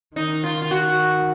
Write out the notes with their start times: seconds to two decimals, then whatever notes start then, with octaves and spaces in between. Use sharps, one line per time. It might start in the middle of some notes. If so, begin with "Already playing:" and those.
0.16 D#3 D#4
0.44 F4
0.62 F4
0.71 F#4